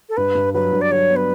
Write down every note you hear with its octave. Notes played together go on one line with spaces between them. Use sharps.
A4
G2 B4
G2
F#3 B4
G2
D5
F#3 C#5
B3
B4